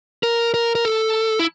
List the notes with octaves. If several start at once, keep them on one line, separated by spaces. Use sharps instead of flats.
A#4
A#4
A#4
A4
E4